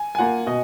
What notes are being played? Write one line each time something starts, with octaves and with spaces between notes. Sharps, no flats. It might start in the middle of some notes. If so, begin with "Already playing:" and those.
Already playing: G#5
G#5
A#3 F4 F#5
B2 D#5